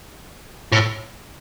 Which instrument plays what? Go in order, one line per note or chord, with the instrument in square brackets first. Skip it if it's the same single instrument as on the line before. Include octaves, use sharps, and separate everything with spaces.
[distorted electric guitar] A2